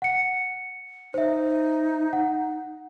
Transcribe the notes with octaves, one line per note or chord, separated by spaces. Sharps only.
F#5 C#7
D#4 C5 E5
F#5